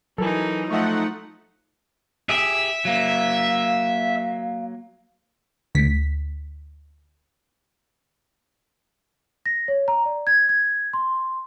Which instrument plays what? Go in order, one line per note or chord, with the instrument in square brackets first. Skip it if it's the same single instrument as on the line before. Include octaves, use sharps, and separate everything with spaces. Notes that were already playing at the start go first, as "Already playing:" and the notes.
[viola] E3 D#4 [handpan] F#3 [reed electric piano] A4 A#4 G#5
[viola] F3 [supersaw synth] A3 D#4 F#5 [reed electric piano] E5 C#6
[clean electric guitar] G4 G#4 [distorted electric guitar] E5
[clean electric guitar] F#3 A#3 [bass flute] F5
[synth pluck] D2 B6
[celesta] A#6
C#5
A#5
D5
G#6
G#6
C6